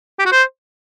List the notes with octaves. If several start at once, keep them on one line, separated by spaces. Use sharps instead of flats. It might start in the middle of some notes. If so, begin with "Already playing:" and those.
G4
F#4
C5